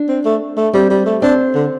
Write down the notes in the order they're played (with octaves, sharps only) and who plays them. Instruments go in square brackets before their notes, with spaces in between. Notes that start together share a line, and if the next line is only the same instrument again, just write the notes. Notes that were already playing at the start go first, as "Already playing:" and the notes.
Already playing: [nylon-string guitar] D4
[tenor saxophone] C4
A3
A3
[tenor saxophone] G3 [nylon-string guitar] C4
[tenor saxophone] G3
A3
[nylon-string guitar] C4 [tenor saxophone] D4
[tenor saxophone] D3